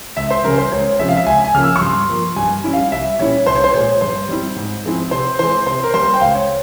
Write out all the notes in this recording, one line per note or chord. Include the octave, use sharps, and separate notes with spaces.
C#2 E5
C5
C#3 G3 C#4 A#4
C5
C#2 C#5
C3 F3 G#3 C#4 E5
F5
E5
C#2 G#5
G#5
C#3 F3 A#3 F6
E6
C#6
G2 C6
F3 A#3
G2 G#5
G3 C#4 E4
F5
C2 E5
A#2 G3 C#4 E4 C#5
C2 C5
C#5
C5
A#2 G#3 C#5
G2 C5
G3 C4 E4
G#2
F3 G#3 C4 E4
C3 C5
E3 G#3 C5
C3 C5
A#4
G3 A#3 C5
G5
C#2 F5
C#5